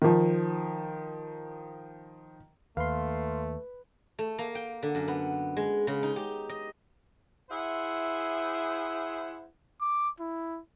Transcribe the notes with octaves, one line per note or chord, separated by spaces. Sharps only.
D#3 F3
D#2 A3 B4 F5 C6
A3
A#3
G5
D3
F#2
B3
G#3
C#3
D#4
G4
D#5
E4 G#4 C5 E5 F#5
D6
E4